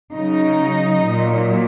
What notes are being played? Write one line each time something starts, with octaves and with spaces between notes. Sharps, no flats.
C#3 F#3 D#4
A#2 F#3